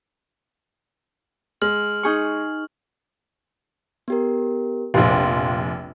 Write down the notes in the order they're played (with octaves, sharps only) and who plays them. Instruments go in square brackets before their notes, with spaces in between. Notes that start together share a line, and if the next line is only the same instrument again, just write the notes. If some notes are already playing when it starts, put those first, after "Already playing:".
[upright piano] G#3 [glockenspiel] F6 F#7
[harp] D#4 G#4 C#6
[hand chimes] B3 G4 A#4
[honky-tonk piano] F1 A#1 [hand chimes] F5 C6